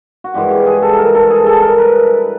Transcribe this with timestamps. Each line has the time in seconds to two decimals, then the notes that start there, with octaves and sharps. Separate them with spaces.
0.24 F#4
0.34 G2 E3 G#3 G4
0.51 G4
0.66 G#4
0.82 A4
0.93 A4
0.98 A#4
1.15 A4
1.30 G#4
1.47 A4
1.62 A#4
1.78 B4